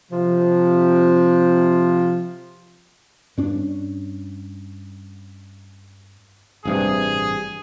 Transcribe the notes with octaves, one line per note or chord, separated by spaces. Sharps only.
C3 F3
G2 C#4 D4
A1 G2 C3 G#4